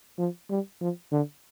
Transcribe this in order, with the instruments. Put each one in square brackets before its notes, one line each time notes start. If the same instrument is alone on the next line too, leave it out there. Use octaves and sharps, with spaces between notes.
[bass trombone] F3
G3
F3
D3